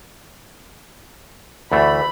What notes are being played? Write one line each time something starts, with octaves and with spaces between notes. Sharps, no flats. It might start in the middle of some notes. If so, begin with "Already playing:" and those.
D2 E3 A3 B5